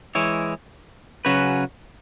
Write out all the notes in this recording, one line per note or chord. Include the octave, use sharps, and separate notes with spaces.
E3 G#3 E4 C#5
C#3 F#3 C#4 F#4 B4